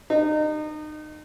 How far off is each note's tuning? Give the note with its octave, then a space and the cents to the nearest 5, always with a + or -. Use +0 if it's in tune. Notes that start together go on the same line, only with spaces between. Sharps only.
D#4 -30